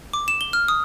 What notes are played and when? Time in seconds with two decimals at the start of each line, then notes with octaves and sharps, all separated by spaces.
0.13 D6
0.28 E7
0.41 G7
0.53 F6
0.68 D#6